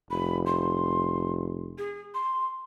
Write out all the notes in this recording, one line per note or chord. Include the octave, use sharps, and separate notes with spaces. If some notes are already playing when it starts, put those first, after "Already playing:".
F1 B5
C6
G#4
C6